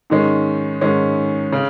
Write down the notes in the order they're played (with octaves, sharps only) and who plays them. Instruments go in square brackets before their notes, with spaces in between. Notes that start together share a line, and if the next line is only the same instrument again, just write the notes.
[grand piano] G#2 D#3 G#3 C#4
G#2 D#3 G#3 C#4
C#3